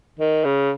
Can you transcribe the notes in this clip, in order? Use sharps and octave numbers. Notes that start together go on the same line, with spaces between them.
D#3
C#3